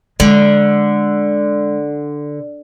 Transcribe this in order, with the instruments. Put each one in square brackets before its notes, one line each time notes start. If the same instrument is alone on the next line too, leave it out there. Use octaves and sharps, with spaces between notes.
[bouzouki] D3 [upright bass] G#3